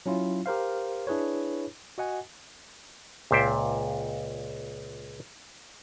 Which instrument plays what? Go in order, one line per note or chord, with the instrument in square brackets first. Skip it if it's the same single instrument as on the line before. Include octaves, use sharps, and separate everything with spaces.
[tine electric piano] F#3 C#4 E4 F4
G4 A#4 C5 F5
D4 E4 G#4 B4 C#5
F#4 D#5 F#5 G#5
[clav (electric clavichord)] C#2 A#2 C5 E5 G5